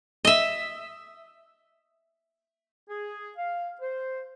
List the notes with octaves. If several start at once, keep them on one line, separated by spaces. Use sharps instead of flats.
D#5 E5
G#4
F5
C5